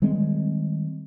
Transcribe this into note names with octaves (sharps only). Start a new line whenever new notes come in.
D#3 G3 G#3 C4